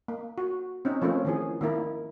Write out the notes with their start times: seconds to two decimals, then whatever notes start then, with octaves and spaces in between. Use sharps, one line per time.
0.08 A#3
0.38 F#4
0.85 C4 C#4 D#4
1.02 F3 A3 A#3 C4 C#4
1.25 D#3 E3 G#4
1.61 D#3 A#3 E4 A#4